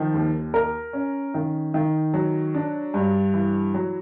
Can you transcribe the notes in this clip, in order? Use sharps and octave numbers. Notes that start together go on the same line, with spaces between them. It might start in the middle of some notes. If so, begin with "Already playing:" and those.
Already playing: D#3 F3
D#2
A#4
C#4
D#3
D#3
F#3
D4
G2
E3
F#3